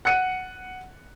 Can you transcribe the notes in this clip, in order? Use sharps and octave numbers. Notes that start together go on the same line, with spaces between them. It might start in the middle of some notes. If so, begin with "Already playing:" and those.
F#5 F#6 C#7 D#7